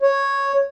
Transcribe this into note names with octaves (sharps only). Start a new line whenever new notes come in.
C#5